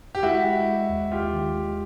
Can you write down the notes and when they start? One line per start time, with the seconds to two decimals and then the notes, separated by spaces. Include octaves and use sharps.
0.15 G4
0.23 G#3 E4 F#4
0.45 G#3
0.68 G#3
0.89 D#2
1.12 D#2 F4 G4
1.33 D#3
1.56 G#3